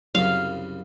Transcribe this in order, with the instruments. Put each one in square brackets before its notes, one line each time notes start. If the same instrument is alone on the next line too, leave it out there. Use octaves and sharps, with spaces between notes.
[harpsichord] C2 F#2 C#3 [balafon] F#3 [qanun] F5